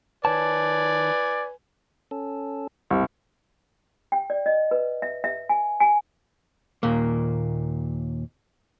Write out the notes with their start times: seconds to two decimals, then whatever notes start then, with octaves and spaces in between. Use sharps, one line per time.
0.25 D#3 B4 C#5 D5 G#5 A5
2.11 C#4 A4
2.91 C2 C3 G3
4.12 G5
4.30 D5
4.46 D#5
4.71 B4
5.02 E5
5.24 E5
5.49 G#5
5.80 G#5
6.83 D#2 A#2 A#3